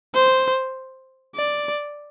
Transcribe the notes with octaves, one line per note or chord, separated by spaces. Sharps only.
C5
D5